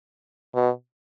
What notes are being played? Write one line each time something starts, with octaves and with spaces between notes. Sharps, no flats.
B2